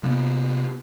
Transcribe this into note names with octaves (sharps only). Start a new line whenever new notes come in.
C3 A#3 B3